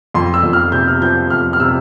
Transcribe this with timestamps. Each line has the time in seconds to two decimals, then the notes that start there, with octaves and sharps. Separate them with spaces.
0.14 F2 C6
0.34 E6
0.43 F2
0.53 F6
0.72 C3 G6
0.88 F6
1.02 F3 G6
1.30 F2 F6
1.53 F6
1.60 C3 E6